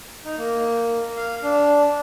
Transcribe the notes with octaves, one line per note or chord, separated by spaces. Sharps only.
D#4
A#3
F5
D4